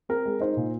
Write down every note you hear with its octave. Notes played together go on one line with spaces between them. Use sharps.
C4 A#4
G#3
D#4 C5
A#2